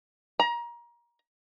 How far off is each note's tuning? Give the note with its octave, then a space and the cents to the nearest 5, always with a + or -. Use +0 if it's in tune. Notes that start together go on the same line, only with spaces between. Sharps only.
A#5 +25